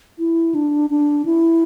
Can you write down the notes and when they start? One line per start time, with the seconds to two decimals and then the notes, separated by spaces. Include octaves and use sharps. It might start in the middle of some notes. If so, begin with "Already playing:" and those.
0.19 E4
0.55 D4
0.90 D4
1.25 E4